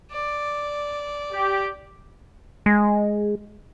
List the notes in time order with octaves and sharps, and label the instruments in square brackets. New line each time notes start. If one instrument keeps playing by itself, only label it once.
[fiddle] D5
[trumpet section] G4
[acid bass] G#3